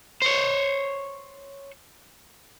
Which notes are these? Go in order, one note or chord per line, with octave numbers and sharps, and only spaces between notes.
C5 C#5